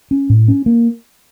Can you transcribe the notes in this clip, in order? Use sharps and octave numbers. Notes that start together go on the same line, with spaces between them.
C#4
A2
C#4
A#3